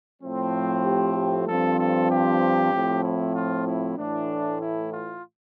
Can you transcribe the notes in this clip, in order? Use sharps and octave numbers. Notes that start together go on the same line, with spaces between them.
A2 F3 A3 C4
G4
G4
G2 F3 C4 A4
A4
G4
A2 F3 C4
E4
F4
E4
A2 E3 A3 D4
E4
F4